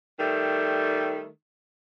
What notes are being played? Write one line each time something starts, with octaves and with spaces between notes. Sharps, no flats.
D#3 G3 A3